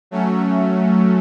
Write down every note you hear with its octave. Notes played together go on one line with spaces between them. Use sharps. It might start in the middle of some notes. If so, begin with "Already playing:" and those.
F#3 A3 C#4